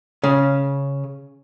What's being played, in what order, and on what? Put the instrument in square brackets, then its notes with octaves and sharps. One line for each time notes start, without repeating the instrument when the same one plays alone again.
[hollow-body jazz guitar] C#3